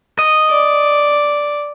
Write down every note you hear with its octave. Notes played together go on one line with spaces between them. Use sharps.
D#5
D5